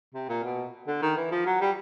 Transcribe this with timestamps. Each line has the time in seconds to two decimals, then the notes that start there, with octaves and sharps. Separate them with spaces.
0.14 C3
0.29 A#2
0.44 B2
0.87 D3
1.02 D#3
1.17 E3
1.32 F3
1.46 F#3
1.61 G3